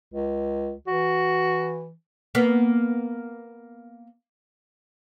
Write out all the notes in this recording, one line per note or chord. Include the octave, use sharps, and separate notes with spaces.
C#2
E3 F#4
A#3 B3